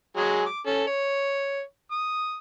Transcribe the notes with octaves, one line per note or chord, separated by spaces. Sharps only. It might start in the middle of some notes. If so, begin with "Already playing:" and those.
F#3 G#3 G#4
D6
C#4 A4
C#5
D#6